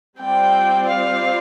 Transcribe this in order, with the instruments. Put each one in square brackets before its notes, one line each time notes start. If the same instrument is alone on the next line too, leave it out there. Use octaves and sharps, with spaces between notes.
[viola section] G3 C4 F4 D5 [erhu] G5
[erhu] F5